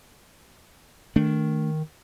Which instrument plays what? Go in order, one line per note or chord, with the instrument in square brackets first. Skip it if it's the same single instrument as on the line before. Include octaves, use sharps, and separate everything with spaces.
[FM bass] D#3 [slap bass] A3 D4